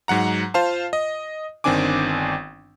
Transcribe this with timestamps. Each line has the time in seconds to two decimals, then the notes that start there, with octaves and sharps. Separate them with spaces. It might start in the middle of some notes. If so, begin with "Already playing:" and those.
0.08 G#2 F#3 F#5 A#5
0.54 F4 C5 F5 A5
0.93 D#5
1.64 G1 D#3 C4 D4 G#5 D6